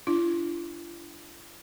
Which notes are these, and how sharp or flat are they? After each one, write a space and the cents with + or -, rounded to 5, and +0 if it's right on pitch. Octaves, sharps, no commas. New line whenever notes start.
D4 -5 F4 -45